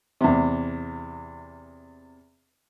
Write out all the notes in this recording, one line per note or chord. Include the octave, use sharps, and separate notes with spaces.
E2 C3